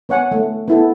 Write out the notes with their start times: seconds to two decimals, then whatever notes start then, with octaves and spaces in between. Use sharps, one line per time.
0.09 B3 C#5 F#5 G#5
0.31 A3
0.68 B3 E4 A4